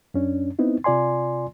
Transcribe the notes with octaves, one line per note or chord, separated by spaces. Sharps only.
F#2 C#4 D4
B3 C4 D#4 E4
C3 F4 D5 G#5 C6